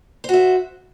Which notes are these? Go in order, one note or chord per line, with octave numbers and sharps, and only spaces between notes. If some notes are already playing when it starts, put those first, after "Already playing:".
F#4 C5 E5